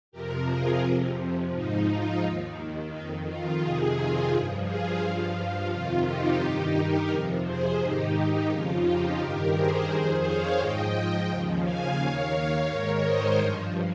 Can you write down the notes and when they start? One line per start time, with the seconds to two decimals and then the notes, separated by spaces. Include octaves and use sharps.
0.12 F2 C3 F3 G4 A#4
0.47 F4 G#4
0.82 F2 C3 F3
1.52 G#2 F3 D#4
1.87 F4
2.21 D#2 D#3
2.91 F2 D#3 D#4
3.26 F4
3.61 F2 C3 D#3 F4 G#4
3.96 F4 G#4
4.31 G2 F3
4.65 F4 G#4
5.00 G2 F3 F4
5.71 F2 C3 D#3 F4
6.05 D#4 G4
6.40 G2 D#3 D#4 G4
6.75 G4 A#4
7.10 F2 C3 F3
7.44 G#4 C5
7.80 G#2 D#3 D#4 G4
8.49 F2 C#3 F3 F4
8.84 D#4 G4
9.19 G2 D#3 G4 A#4
9.54 G#4 C5
9.89 F2 D#3 G#4 C5
10.24 C#5 F5
10.58 G#2 F3 D#5 G5
11.29 D#2 C#3 F3
11.63 F5 G#5
11.98 D#2 D#3 C#5 F5
12.33 C#5 F5
12.68 G#2 D#3 A#4 C#5
13.02 C5 D#5
13.38 G2 F3